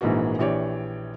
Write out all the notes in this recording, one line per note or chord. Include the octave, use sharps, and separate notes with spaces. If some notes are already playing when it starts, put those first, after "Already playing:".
A#1 G#2 E3 A#3 F#4
A#1 E3 G4 C#5 D5